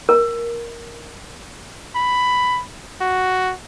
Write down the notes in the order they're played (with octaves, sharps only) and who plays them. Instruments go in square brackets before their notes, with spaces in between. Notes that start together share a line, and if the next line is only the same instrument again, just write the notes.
[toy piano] A#4
[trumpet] B5
F#4